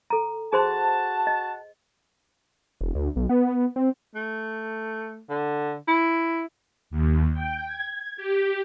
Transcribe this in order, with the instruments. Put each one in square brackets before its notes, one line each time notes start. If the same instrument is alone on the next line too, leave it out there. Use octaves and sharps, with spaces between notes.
[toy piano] A4 A#5
[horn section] F#4 F#5 A5 [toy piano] G#4 C5 C6
[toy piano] D#5
[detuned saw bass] E1
D2
B1
B3
C4
[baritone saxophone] A3
D3
E4
[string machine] D#2
G5
G#6
G4